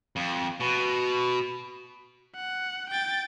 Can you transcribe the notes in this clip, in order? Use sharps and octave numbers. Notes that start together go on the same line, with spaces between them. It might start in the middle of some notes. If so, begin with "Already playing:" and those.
F2
B2
F#5
G5 A6